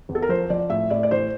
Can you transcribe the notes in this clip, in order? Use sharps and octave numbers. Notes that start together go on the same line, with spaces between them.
E2
A4
A#4
F3 C5
F3 D5
A2 E5
A2 D5
D5
E3 C5